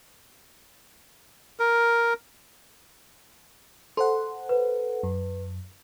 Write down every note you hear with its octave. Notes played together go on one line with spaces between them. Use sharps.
A#4
A4 C5 F#5 C6
B4
F#2